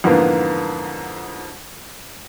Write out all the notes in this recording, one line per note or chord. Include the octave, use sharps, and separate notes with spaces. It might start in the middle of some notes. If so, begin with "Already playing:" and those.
F2 G#2 D3 E3 A#3 B3